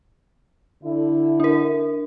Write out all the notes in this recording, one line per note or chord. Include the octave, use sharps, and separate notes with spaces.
D3 E4
D4 A#4